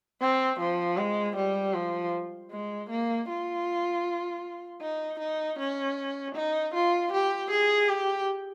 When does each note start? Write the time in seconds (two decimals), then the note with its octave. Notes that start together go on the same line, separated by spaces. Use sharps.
0.21 C4
0.60 F3
0.97 G#3
1.36 G3
1.74 F3
2.51 G#3
2.90 A#3
3.28 F4
4.81 D#4
5.19 D#4
5.59 C#4
6.35 D#4
6.74 F4
7.12 G4
7.50 G#4
7.88 G4